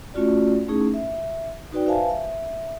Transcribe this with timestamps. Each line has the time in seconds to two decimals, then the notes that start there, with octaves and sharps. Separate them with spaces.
0.14 A3 C#4 F4 F#4 D5
0.68 A3 C#4 D#4 E4 G#4
0.94 E5
1.73 D#4 F#4 B4 D5 G5
1.86 B4 C5 E5 F5 G#5 A5
2.10 E5